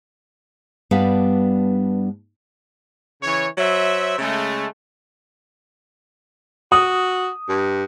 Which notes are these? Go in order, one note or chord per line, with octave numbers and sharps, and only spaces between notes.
G2 G3 B3 D4 B4 F5
C#3 E3 C#5
F#3 C5 E5
C#3 G#3 A3
F#4 D#6
G2